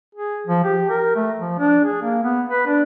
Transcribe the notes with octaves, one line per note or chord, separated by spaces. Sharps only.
G#4
F3
G4
A#4
A3
F3
D4
G#4
A#3
B3
B4
D4